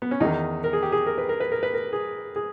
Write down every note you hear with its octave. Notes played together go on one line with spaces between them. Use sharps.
B3
C#4
E2 D#3 D#4
A#4
G#4
G4
G#4
A#4
B4
A#4
B4
A#4
B4
A#4
G#4
G#4